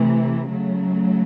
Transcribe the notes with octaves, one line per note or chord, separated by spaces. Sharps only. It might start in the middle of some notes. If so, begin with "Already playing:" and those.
Already playing: C3 E3 A3
C#3 F#3 A3